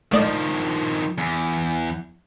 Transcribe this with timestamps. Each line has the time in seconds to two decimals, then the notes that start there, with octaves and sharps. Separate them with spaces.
0.12 D#3 F3 A3 D5 D#5
1.18 E2